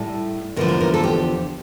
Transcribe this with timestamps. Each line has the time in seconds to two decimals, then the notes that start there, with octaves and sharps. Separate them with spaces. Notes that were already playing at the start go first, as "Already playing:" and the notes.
Already playing: A2 G3 A4
0.56 E2 D3 F3 A#4
0.68 A#4
0.81 A#4
0.94 A4
1.04 G4